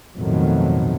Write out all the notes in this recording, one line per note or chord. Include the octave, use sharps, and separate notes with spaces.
B1 F2 A2 D#3 F#3